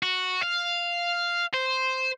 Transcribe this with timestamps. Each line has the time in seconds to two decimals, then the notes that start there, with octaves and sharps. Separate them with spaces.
0.03 F#4
0.43 F5
1.54 C5